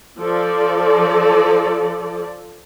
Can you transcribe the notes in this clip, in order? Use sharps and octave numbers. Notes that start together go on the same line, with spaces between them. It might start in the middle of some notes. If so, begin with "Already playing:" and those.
F3 A4 D5